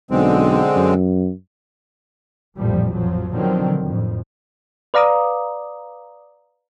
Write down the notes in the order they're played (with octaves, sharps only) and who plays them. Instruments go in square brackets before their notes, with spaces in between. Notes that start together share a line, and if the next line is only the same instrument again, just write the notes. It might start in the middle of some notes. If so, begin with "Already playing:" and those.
[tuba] B1 [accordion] D3 G#3 C4
[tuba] F#2
[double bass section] A1 F2 A#2 F3 G3
F2 F3 F#3
B2 D3 D#3 F3 F#3 C4
F2 A2
[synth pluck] B4 D5 F5 A#5 D6 D#6